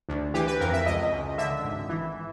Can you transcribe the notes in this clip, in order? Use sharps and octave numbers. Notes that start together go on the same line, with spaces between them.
D2
E3 G4
B4
F2 A#4
E5
C#2 D#5
C#2
D3 E5
G#1
E3